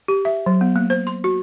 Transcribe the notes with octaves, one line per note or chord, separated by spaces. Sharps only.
G4
E5
F#3
B3
A#3
C5
C6
F#4